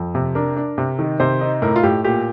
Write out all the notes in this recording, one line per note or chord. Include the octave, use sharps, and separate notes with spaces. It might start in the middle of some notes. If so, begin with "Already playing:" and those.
Already playing: F2
C3
D4 A#4
D4
C3
D#3
C3 C5
D#4
A2 A#4
F4
A2 G4
A#2 G4